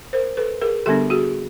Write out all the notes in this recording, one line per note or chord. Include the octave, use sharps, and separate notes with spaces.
A#4 C5
A4 B4
G#4 A#4
D3 G3 B3 D4 G4 A4
F#4 G#4